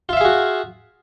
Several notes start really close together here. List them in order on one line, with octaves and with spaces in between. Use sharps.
F4 E5 F5 G#4 F#4